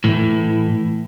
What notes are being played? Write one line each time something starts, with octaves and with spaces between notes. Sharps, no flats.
A2 E3